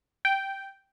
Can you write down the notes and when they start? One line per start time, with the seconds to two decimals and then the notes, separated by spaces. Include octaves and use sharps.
0.25 G5